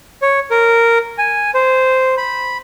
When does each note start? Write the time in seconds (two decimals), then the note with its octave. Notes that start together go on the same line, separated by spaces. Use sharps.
0.22 C#5
0.51 A#4
1.18 G#5
1.54 C5
2.17 B5